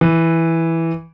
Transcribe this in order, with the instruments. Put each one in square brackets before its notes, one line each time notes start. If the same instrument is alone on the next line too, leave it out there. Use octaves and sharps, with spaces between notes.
[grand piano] E3